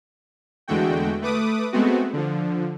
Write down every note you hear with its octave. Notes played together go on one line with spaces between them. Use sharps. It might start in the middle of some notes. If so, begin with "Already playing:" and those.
E2 D3 G#3 A3 F#4 G5
A3 B4 D6 D#6
G#3 A3 B3 C4 F#4
D3 F3